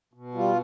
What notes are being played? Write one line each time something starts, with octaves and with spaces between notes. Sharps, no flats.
B2
G3 F4